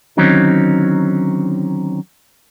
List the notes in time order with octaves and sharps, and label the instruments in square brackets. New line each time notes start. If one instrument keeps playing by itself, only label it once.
[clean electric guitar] D3 D#3 F#3 C4 C#4 D#4